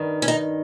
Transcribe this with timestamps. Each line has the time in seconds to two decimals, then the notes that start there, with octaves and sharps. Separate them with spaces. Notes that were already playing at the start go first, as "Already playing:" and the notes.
Already playing: G2 D#3
0.22 C#4
0.28 D#4